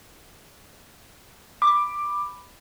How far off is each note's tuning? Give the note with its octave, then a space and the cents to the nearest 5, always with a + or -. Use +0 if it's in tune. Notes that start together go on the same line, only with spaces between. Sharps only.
B5 +0 D6 +10